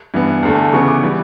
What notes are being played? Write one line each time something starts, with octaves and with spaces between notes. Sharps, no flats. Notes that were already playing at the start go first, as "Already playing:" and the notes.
G2 E3 B3
E2 D3 A3
C#3 E3 B3 C#6
D6
E3 G3